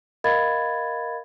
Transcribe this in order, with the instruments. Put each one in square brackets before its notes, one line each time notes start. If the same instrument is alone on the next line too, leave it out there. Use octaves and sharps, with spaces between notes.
[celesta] A#4 D#5 F5 B5 G#6 A6